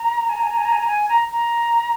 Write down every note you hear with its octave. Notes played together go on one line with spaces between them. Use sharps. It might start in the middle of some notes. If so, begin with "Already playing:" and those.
Already playing: A#5
G#5
A#5
G#5
A#5
G#5
A#5
G#5
A#5
G#5
A#5
A#5